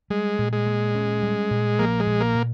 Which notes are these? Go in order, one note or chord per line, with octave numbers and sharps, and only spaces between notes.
G3 G#3
A#2
G#3
A#2
C#4
G3
A#2
F3 A#3
G#3
A#2
A#3
A#2